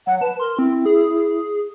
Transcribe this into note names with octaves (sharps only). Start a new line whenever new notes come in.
F#3 F#5
B4 A5
A#4 C6
C4 E4
G#4